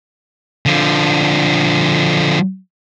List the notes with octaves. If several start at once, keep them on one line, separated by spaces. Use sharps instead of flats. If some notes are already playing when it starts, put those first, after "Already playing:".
D3 F3